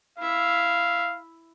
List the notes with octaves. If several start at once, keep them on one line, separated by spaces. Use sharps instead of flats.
E4 E5 F5